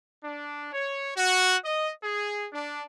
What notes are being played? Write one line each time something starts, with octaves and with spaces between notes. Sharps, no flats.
D4
C#5
F#4
D#5
G#4
D4